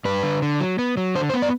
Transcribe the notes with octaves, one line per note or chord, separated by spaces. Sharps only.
G2 B4
D3
D3
F#3
B3
F#3
D3 C5
C5
B3
D5